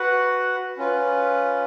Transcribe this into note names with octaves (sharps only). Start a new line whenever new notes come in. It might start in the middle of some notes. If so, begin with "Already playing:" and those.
Already playing: F#4 B4 F#5
C#4 F4 B4